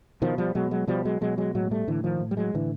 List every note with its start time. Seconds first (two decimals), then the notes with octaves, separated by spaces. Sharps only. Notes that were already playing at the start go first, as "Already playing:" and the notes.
0.22 B2 D#3 F3
0.38 F3 G3
0.55 B2 F#3 G#3
0.71 F#3 G#3
0.87 B2 F3 G3
1.05 F#3 G#3
1.21 B2 F#3 G#3
1.38 F#3 G#3
1.55 A2 F#3 G#3
1.71 G3 A3
1.88 A2 D3 E3
2.04 D#3 F3
2.20 A2
2.31 G3
2.37 F#3 G#3
2.54 A2 D3 E3